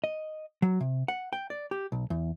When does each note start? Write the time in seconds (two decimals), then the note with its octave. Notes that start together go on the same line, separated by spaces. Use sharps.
0.04 D#5
0.62 F#3
0.80 C3
1.08 F#5
1.33 G5
1.50 D5
1.71 G4
1.92 B1
2.10 E2